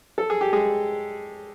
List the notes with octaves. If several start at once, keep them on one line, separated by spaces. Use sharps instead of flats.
A4
G#4
G4
G#3 G#4